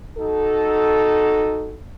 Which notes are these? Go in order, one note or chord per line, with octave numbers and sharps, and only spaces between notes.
D#4 F#4 A4